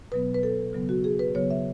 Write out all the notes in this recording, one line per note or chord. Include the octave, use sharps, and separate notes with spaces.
B2 F#3 B3 B4
B4
A4
C#3 F#3 B3
F#4
G#4
B4
C#3 F#3 B3 C#5
E5